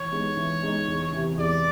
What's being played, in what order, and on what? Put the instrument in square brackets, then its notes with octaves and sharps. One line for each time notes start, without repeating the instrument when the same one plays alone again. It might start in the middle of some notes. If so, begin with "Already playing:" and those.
Already playing: [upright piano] E3 [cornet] C#5
[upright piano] G#3 B3 D#4
E3
G#3 B3 D#4
E2
C3 E3
[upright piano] E2 [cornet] D5